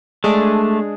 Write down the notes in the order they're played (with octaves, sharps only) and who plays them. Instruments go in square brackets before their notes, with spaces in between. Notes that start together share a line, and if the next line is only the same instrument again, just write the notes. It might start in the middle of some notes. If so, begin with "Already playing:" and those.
[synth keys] G#3 D4 G#4 [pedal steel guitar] A3